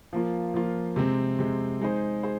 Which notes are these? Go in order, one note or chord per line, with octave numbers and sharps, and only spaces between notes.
F3 A#3 F4
F3 A#3 F4
C3 G#3 C4
C3 G#3 C4
G#3 D#4 G#4 C5
G#4 C5